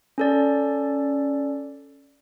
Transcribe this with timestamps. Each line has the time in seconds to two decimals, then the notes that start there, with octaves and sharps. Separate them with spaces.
0.18 C#4 A4 D5